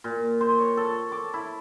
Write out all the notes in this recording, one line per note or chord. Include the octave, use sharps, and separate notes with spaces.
A#2
C5
C#5
A4
D6
E4